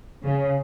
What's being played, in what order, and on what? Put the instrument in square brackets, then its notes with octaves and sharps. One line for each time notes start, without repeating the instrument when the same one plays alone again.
[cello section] C#3